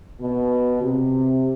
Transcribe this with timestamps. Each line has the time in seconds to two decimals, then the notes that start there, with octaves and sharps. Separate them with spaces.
0.20 B2
0.82 C3